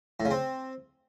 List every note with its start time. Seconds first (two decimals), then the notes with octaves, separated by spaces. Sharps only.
0.20 A2
0.25 C#3
0.31 C4